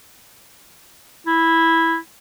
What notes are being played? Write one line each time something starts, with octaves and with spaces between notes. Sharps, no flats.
E4